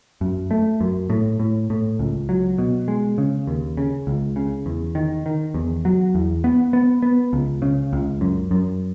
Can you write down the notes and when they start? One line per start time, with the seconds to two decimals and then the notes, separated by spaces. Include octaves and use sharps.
0.21 F#2
0.51 A3
0.81 F#2
1.10 A2
1.40 A2
1.70 A2
1.99 C#2
2.29 F#3
2.58 B2
2.88 G#3
3.18 C#3
3.47 D#2
3.77 C#3
4.07 C#2
4.36 C#3
4.66 E2
4.95 D#3
5.26 D#3
5.54 E2
5.85 F#3
6.15 E2
6.44 B3
6.73 B3
7.02 B3
7.33 C#2
7.62 C#3
7.93 C#2
8.21 F#2
8.51 F#2